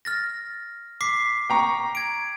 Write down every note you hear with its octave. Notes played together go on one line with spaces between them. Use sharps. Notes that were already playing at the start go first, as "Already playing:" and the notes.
F6 A6 A#6
D6 B6 C7
G5 A#5 C#6
G#6 D7